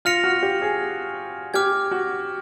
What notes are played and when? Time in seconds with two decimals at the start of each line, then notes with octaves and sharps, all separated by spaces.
0.05 F4 F6 A#6 C#7 F7
0.24 F#4
0.43 G4
0.62 G#4
1.54 G4 D6 F6 G#6
1.91 F#4